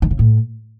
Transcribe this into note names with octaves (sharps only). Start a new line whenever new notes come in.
D#3
C#3
A2